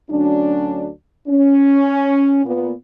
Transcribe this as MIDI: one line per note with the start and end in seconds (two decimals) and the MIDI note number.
0.10 0.88 38
0.10 0.88 54
0.10 0.88 61
0.10 0.88 62
1.27 2.42 61
2.45 2.71 46
2.45 2.71 59